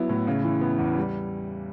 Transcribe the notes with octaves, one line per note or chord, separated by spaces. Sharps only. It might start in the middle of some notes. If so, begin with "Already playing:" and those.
Already playing: F#3 B3 E4
A2
C#3
E3
B3
E2
G3